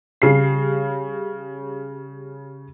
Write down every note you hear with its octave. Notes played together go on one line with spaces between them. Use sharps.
C#3 G3 C7